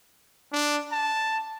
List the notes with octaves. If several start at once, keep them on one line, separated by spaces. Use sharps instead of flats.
D4
A5